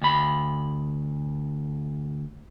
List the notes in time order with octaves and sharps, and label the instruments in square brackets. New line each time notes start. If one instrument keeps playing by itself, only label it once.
[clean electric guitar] D2 B5